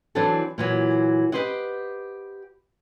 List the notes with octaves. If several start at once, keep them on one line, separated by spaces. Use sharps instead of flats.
E3 F#3 C4 D4 A4 A5
A#2 E3 F#3
G4 A4 B4 C5 D#5 F#5